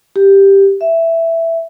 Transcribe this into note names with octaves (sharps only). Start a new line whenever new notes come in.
G4
E5